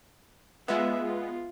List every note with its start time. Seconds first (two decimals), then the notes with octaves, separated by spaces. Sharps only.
0.68 G#3 B3 F4 E5
1.01 F4